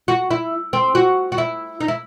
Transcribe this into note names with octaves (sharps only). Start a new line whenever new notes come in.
F#4
E4
C4
F#4
F#4
E4
D#4
E4